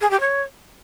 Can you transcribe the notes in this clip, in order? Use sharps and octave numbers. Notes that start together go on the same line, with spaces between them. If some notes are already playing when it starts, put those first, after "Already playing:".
G#4
G4
C#5